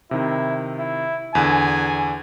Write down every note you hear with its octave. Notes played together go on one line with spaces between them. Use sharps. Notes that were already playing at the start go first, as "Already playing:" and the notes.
C3 D#3 E4
E4
E2 D3 B3 G#5